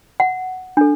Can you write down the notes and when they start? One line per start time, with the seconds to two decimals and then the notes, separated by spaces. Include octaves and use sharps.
0.20 F#5
0.77 D4 A4